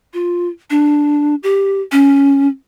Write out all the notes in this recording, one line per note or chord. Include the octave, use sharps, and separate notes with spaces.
F4
D4
G4
C#4